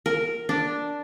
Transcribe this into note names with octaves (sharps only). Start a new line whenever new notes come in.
A#4
D4